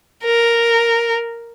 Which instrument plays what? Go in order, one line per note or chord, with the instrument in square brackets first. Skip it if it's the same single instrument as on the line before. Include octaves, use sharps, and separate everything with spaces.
[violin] A#4